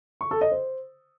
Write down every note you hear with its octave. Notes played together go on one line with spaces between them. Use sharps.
C#6
A4
D#5
C5